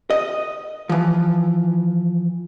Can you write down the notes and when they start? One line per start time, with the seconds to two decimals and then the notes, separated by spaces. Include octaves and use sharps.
0.10 D#5
0.89 E3 F3